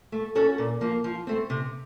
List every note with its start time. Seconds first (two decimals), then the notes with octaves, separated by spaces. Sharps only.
0.12 A3
0.35 C#4 F#4 A4 C#5
0.58 A#2
0.81 F3 A#3
1.04 F3
1.27 A3 C4
1.50 C3